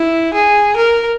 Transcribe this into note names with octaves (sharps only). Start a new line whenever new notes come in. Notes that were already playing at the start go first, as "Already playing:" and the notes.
Already playing: E4
G#4
A#4